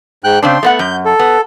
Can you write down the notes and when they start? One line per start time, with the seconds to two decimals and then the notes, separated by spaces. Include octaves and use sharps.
0.24 G#2 G5 F#6
0.43 C#3 C4 D4 C6
0.63 A3 B3 F#5
0.79 F#2 G6
1.05 A4
1.19 B3